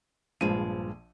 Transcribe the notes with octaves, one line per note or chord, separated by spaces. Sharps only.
A#1 G2 F3 G#3 D#7